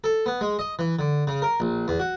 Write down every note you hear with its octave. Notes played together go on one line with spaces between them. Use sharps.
A4
B3
G#3
D#5
E3
D3
C#3
A#4
A#1
E2
F#4